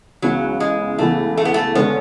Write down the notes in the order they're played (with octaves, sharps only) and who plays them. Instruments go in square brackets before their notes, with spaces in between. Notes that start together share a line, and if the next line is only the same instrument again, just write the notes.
[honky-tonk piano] C#2 C#3 E3 B3 [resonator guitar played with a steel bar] F#3
[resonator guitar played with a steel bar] G#3
[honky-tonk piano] C#2 C#3 E3 B3 [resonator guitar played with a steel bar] A3
[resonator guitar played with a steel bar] A3
B3
A3
[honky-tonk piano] D3 G#3 C#4 [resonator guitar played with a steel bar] B3